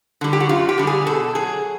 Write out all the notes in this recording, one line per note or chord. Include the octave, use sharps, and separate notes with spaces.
D3 G3
G4
F#4
F#2 F4
G4
D3 G3
G#4
B2 A4
F#3 G#4